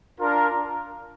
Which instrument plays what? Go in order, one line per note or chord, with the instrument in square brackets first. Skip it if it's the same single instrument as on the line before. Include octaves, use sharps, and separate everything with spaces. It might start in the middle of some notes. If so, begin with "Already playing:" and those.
[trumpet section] D4 F4 A#4